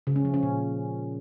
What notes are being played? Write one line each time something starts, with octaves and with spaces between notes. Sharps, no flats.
C#3
C#4
F3
C#4
A#2